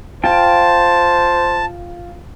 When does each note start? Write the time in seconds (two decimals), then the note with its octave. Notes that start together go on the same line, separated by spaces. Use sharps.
0.24 F4 C5 G5 A5